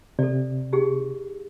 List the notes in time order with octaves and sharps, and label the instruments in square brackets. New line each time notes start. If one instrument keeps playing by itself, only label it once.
[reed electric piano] C3 [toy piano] A4 D5
[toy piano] D#4 G4 G#4